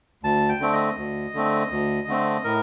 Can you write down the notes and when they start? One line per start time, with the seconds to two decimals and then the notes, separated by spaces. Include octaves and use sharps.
0.23 D2 A5
0.49 G5
0.60 D3 A3 C4
0.73 D#5
0.97 D2
1.34 D3 A3 C4
1.71 D2
2.08 D3 A3 C4
2.44 A2 A#4